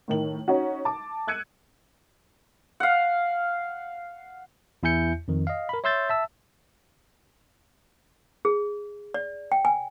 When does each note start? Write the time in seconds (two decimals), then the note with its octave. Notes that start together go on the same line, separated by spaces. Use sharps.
0.08 A2 D#3 F#7
0.48 C#4 D#4 F#4
0.85 A5 D6
1.27 E6 F#6 G#6 C#7 D#7
2.80 F5 F#5
4.83 E2 E4 E5 G#5 G6 C#7
5.28 F2 D#3
5.47 D#5 F5
5.69 A#4 B5
5.84 C#5 E5 C6 E6 G6 A6
6.09 E5 A5 E6
8.45 G#4
9.14 D5
9.52 G5
9.65 G#5